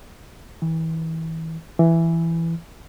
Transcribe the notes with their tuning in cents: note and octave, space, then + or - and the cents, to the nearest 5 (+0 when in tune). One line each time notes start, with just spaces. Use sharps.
E3 -30
E3 +10